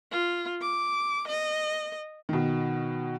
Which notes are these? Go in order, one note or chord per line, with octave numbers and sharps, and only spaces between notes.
F4
D6
D#5
B2 D#3